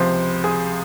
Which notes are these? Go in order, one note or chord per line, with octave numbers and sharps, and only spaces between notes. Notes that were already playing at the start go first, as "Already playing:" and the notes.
Already playing: C#2 C3 F3 C5
G#4